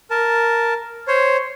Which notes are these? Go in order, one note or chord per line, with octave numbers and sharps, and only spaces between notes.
A#4 A5
C5 C#5